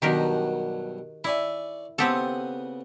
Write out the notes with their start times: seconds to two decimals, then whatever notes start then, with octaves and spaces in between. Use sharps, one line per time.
0.02 G2 B2 D#3 F#3 G4 A#4
1.24 E4 C#5 D5 G#5
1.98 C#3 B3 C4 G4 A4 D#6